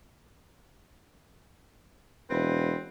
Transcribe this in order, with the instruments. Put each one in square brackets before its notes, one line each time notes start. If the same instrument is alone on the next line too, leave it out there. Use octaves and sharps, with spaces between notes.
[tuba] E1 [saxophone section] C4 B4